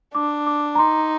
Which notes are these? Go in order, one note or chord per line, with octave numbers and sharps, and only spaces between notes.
D4 D6
D6
A#5
D#4 C6